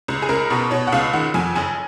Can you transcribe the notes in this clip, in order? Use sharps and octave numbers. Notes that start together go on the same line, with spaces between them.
C#2
G#4
C#2 A#4
B2
B2 C#5
F#5
C#2 F5
D#3 F#5
F2 G#5
F#1 G#5